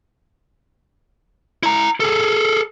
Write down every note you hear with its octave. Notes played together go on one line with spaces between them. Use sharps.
E4 A#5
G#4 A4